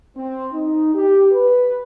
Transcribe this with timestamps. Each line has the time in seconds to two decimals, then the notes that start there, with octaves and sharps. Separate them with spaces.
0.17 C4
0.53 D#4
0.95 G4
1.32 B4